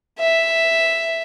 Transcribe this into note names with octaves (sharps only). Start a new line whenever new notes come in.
E5